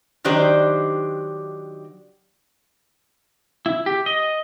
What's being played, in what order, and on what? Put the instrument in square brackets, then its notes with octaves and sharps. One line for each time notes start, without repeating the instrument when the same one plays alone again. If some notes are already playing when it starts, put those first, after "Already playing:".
[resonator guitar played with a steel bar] D#3 F#3 D4 G4 C5
[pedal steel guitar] E4
G4
D#5